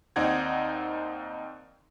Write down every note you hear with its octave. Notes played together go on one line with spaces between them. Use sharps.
D#2 C4 D#4 D5 F#5 G#6